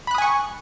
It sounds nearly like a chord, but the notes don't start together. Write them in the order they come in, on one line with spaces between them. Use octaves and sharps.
B5 F#6 D#6 G#5 C#6